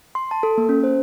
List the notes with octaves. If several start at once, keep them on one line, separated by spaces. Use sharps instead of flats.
C6
A5
A4
A#3
C#4
C5